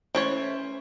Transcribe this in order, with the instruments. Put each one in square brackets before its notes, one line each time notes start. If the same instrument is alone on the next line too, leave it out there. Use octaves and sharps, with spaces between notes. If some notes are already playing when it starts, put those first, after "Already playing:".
[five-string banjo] E3 A3 C#5 [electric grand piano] C#4 C5 D7